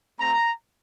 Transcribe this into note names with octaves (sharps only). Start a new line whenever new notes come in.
A3 C4 F4 A#5